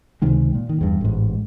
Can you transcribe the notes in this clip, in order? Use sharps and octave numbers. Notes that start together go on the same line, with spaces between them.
C#2 C3 D#3 G#3
A#2
D#3
E2 G2
A1 G#2